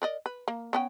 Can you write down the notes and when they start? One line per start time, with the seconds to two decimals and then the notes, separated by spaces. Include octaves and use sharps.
0.02 A#4 D5 D#5
0.26 B4
0.48 A#3
0.73 B3 C#4 G5